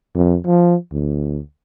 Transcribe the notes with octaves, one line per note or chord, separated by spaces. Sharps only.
F2
F3
D2